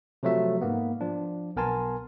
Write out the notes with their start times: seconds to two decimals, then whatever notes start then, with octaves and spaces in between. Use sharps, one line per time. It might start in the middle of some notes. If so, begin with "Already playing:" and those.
0.23 C3 F3 F#3 A3 E5
0.61 G#2 A#3 B3
1.01 F3 D4
1.56 B1 B3 A#4 G#5 A5 C6